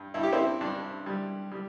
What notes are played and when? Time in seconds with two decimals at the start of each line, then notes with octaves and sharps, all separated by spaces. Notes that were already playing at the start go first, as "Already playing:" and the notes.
Already playing: G2
0.14 G2 E4
0.23 G4
0.33 C4 E4
0.61 G2 D4
1.06 G3
1.52 G3